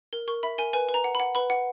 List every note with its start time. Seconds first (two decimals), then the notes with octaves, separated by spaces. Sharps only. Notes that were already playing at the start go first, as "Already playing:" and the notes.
0.13 A#4
0.28 A#4 C#6
0.43 E5 B5
0.58 A#4 G#5
0.73 B4 G#5
0.89 B4
0.94 A#5
1.04 F#5
1.15 F#5 B5
1.35 B4 B5
1.50 F#5